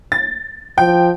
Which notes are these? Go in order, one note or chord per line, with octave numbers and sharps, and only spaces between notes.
A6
F3 G5